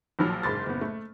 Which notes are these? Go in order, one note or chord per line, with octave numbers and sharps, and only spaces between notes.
A#1 A#2 F3 F#3 F6
F#1 G#2 C6 A6
F#1 B3
A3